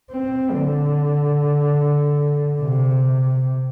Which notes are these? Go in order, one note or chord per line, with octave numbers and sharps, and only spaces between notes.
C4
D3
C3